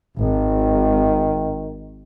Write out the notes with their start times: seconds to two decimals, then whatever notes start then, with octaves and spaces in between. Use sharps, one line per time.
0.20 G#1 D#3